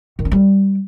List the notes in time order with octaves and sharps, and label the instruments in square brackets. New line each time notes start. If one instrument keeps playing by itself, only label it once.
[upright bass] D#3
C#4
G3